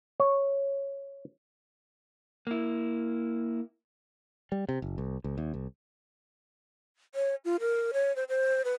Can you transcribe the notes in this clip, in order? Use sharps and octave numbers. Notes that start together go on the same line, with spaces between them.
C#5
A#3 E4
G3
C3
F#1
C2
C#2
D#2
C2
C#5
F4
A#4
C#5
C5
C5
B4